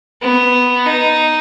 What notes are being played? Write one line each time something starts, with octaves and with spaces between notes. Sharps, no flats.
B3
D#4